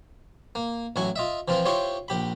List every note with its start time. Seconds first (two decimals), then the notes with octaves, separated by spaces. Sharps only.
0.55 A#3
0.96 A1 F#3 E4 G#5 C#6
1.16 F4 D#5 E5
1.48 E3 F3 C4 F4
1.65 E4 F4 G4 C5 C#5
2.08 A#1 G4 B5